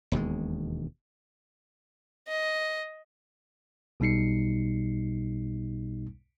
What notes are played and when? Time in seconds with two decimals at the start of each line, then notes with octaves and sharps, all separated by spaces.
0.12 E1 D#2 B2 G#3
2.28 D#5
4.00 B1 B2 G3 D#4 C7 C#7